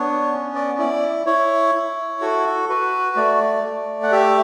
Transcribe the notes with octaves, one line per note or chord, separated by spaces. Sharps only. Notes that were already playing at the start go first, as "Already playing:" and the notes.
Already playing: B3 D4 C#5
C#4
D5
E4 D5
E4 C#5
E4
F#4 A4
F#4 B4
A3 D5
A3
F#5
G4 E5